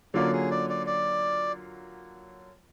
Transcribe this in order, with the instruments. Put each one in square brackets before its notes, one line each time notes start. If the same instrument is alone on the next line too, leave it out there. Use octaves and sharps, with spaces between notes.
[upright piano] D3 F#3 A#3 C#4 F4 [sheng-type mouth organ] D5
[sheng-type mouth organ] G#4
D5
D5
D5